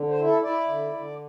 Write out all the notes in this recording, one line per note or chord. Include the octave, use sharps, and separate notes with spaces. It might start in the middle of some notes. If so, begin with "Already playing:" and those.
Already playing: D3
C5
E4
A4
E4 D5
D3
D3